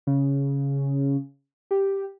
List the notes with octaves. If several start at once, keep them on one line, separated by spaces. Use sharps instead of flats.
C#3
G4